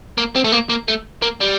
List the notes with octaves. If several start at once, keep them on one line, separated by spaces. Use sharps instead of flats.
A#3
C4
A3
A#3
A#3
A3
A#3
G3